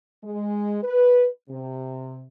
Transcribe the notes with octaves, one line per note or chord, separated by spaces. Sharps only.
G#3
B4
C3